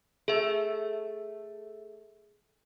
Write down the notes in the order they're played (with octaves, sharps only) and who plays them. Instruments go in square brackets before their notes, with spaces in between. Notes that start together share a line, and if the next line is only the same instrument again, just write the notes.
[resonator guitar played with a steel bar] A3 A4 [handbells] G#4 E5